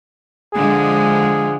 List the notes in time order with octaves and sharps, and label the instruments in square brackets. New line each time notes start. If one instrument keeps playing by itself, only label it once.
[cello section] D3 F3 G#3 [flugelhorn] G#4